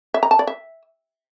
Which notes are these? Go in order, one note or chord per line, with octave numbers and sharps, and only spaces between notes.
E5
A#5
A5
D5
E5